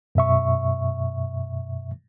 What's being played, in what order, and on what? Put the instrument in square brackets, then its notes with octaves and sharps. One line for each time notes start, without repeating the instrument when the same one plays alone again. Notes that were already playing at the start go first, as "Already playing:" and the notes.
[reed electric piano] F#2 B2 E5 C#6